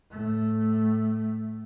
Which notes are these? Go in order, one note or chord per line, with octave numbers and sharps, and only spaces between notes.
A2 A3